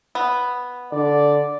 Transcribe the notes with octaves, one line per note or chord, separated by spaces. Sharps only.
B3
D3 D5